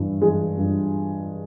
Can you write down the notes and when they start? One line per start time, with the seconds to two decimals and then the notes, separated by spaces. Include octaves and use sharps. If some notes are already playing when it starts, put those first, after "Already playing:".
Already playing: G2 E3
0.21 E3 G#3
0.58 G2